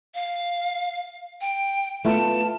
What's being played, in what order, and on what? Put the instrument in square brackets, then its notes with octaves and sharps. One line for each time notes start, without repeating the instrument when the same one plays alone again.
[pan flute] F5
G5
[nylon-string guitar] A3 B3 F4 [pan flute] A5